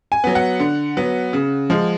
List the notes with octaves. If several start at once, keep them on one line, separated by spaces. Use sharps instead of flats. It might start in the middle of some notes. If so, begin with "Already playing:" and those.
G#5
F#3 B3
F#5
D3
F#3 B3
C#3
F3 G#3